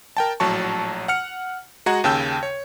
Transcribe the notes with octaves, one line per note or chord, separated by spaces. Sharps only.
A#4 G5 A5
A#1 A2 F#3 A5 C#6
F#5 F6 C#7
G#3 F#4 D#5 F#5 A#5 G#6
D#2 C#3 G5 A5 E6 G6
C#5